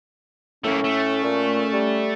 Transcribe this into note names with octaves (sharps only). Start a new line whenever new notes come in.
A2 A3 A#3 C#4
A3
A#2
G3